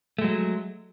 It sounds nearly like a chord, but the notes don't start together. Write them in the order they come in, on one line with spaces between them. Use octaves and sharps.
A3 G#3 F#3